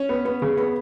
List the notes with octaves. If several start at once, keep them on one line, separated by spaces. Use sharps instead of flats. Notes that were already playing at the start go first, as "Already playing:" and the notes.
Already playing: C#4
B3
B3
C#3
B3